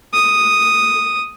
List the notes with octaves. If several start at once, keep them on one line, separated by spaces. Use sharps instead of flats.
D#6